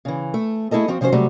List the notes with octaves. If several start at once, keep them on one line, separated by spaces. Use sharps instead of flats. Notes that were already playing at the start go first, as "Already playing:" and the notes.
C#3 E3
A3
A3 E4 G#4 A4 D#5
F3 C4 F#4
C3 F3 C#4 F#4 C5
C3 F#3 G3 A3